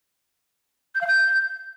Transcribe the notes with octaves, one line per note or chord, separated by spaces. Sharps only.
G6
F5
G6